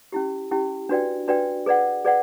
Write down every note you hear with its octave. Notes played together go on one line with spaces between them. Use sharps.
C#4 E4 G4
C#4 E4 G4
D4 F#4 B4 D5 G5
D4 F#4 B4 D5 G5
G#4 B4 D5 F#5
G#4 B4 D5 F#5